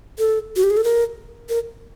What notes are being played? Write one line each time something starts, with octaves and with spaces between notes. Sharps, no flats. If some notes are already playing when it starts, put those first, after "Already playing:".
A4
F#4
G4
G#4
A4
A#4
A#4